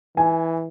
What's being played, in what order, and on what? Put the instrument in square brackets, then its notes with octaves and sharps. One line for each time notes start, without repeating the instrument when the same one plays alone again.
[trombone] E3 [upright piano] G#5